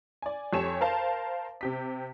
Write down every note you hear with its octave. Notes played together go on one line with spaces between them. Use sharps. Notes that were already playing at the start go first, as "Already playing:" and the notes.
D5 G#5
F2 G4 A4 C#5 G#5 E7
A#4 C5 F5 A5
C3 G4 B6